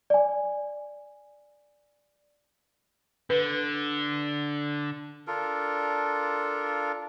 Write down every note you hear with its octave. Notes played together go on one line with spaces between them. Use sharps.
D5 G#5
D3 B4
D4 F4 A4 A#4